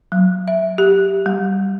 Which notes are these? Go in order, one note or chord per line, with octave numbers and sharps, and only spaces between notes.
F#3
E5
G4
G3